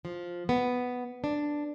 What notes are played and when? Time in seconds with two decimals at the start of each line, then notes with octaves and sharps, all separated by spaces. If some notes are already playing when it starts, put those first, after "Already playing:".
0.05 F3
0.49 B3
1.24 D4